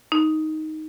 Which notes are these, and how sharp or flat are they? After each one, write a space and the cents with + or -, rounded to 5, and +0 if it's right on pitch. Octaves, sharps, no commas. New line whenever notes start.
D#4 +5